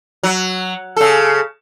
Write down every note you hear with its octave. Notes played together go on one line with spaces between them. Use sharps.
F#3
C#3 A4